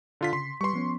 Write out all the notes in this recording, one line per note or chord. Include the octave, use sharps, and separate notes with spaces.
D3 F4 B6
C#3 C6
G3 B4 C6 C#6
F3 B3 C#4